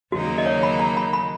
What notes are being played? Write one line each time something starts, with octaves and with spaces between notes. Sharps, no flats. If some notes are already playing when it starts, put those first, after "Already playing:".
D#2 C#3 F#3 A#3 D#4 F#4
D#5
C#5
B5
A#5
B5
B5